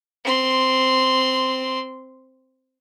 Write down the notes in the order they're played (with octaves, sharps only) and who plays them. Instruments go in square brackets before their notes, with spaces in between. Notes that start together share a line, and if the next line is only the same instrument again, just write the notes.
[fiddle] C4 C6